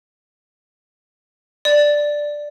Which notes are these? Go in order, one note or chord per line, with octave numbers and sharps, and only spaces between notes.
D5